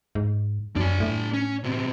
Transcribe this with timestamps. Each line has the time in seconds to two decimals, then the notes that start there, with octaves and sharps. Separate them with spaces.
0.15 G#2
0.76 F#2 D4 G#5
1.00 A2
1.33 C#4
1.64 B2 C4